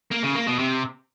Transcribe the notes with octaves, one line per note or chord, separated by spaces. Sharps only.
A#3
C#3
A#3
B2
C3